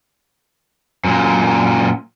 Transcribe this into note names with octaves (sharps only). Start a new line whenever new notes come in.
F#2 A#2